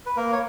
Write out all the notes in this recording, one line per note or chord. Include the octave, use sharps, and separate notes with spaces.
B4
A#3 A#4
C#5